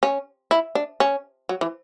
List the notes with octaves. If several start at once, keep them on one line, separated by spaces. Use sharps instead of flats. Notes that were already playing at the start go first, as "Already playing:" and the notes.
C#4
E4
D4
C#4
F#3
E3